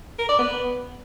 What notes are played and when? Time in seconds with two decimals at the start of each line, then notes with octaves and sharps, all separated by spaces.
0.19 A#4
0.29 D5
0.39 B3